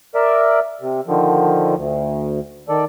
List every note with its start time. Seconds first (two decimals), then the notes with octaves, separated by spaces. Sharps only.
0.15 A#4 D5 E5
0.81 C3
1.07 D3 D#3 F3
1.76 D2
2.68 D#3 A4 D5